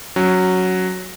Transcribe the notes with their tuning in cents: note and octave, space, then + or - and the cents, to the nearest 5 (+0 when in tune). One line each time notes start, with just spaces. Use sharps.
F#3 +0 C#4 +0